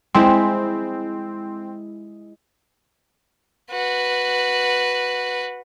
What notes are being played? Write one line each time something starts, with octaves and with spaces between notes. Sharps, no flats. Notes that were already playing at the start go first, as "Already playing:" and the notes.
G#3 C4 E4
F#4 B4